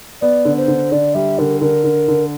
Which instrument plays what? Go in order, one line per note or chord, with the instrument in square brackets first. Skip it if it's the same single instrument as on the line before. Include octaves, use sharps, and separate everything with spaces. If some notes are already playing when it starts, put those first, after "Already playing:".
[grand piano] B3 [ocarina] D5
[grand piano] D3
[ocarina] C5
[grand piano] D3
[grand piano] D3 [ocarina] D5
[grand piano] G3 [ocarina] E5
[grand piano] D3 [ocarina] A#4
[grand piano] D3 [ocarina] A#4
[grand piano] D3
D3